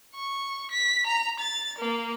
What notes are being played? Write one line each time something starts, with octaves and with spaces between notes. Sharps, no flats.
C#6
B6
A#5
A6
A#3